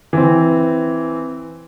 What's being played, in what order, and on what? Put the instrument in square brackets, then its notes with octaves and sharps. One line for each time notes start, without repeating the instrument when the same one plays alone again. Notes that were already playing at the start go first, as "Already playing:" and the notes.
[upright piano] E3 C4